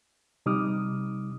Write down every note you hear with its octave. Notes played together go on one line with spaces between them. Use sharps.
C3 G3 D#4 D6 D#6 F6